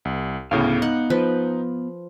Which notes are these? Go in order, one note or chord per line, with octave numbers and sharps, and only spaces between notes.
C2
D2 A2 C#3 B3 F5
D#4 F#5
F3 B4